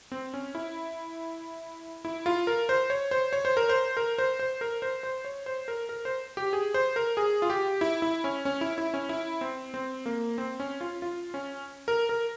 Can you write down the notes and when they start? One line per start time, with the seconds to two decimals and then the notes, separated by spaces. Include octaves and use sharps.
0.12 C4
0.34 C#4
0.55 E4
2.05 E4
2.26 F4
2.47 A#4
2.69 C5
2.90 C#5
3.11 C5
3.33 C#5
3.45 C5
3.57 A#4
3.69 C5
3.97 A#4
4.18 C5
4.40 C5
4.61 A#4
4.82 C5
5.03 C5
5.25 C#5
5.46 C5
5.68 A#4
5.89 A#4
6.05 C5
6.37 G4
6.53 G#4
6.74 C5
6.96 A#4
7.17 G#4
7.42 F4
7.50 G4
7.81 E4
8.02 E4
8.24 C#4
8.45 C#4
8.61 E4
8.78 E4
8.94 C#4
9.09 E4
9.41 C4
9.74 C4
10.06 A#3
10.38 C4
10.60 C#4
10.81 F4
11.02 F4
11.34 C#4
11.88 A#4
12.09 A#4